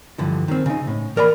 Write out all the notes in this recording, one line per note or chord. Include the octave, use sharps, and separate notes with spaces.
G2 D3 E3 F3
D#3 C4
C#3 D#4
A2
E3 A#4 D5 F#5 B5